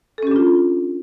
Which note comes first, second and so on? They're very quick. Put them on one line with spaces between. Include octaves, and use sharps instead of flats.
A4 C#4 G4 D4 F4